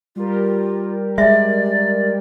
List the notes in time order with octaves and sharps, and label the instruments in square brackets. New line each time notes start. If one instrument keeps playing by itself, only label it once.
[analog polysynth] G3 G4 A#4 [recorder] F4
[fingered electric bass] G#3 [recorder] D5 [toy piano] E5